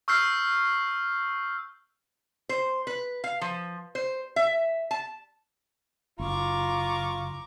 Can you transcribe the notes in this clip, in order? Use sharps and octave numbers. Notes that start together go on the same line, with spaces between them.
C#6 E6 F6 G6 C7
C5
B4
F5
F3
C5
E5
A5
F#1 F4 A#5 C#6 D6